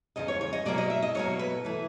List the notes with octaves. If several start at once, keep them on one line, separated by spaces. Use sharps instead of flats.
E2 C#3 F3 D#5
C#5
C#5
D#5
B2 F#3 A#3 D5
D#5
E5
D#5
B2 F#3 A#3 C#5
B4
E3 A3